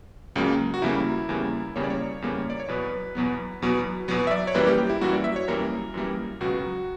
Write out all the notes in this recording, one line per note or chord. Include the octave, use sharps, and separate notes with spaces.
C#2 C#3 F#3 A#3
F#4
E2 C#3 G3 A#3 E4
E2 C#3 G3 A#3
E2 C#3 G3 A#3 C#5
D5
C#5
E2 C#3 G3 A#3
D5
C#5
E2 B2 F#3 B3 B4
E2 B2 F#3 B3
E2 B2 F#3 B3
E2 B2 F#3 B3
E5
D5
C#5
F#2 E3 G3 A#3 B4
G4
G4
E4
F#2 E3 G3 A#3 F#4
D5
E5
C#5
F#2 E3 G3 A#3 A#4
F#2 E3 G3 A#3
C#2 B2 F#3 B3 F#4